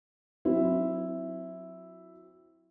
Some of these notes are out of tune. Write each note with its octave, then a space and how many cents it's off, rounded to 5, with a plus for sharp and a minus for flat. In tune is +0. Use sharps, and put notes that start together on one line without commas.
F#3 -20 C4 +0 E4 +0